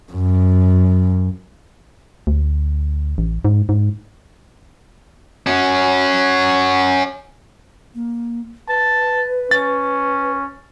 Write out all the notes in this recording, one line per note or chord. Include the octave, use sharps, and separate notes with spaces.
F#2
D2
A1
G#2
G#2
C#4 F#4
A#3
B4 A5
C#4 A6